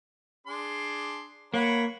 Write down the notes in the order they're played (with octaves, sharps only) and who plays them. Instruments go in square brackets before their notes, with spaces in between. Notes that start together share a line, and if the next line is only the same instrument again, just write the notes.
[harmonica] D4 G#4 C6
[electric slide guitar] A#3 [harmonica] C#5 F#5 B5